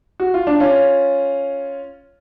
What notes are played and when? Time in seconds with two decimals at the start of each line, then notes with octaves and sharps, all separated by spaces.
0.20 F#4
0.34 F4
0.47 D4
0.60 C#4 F4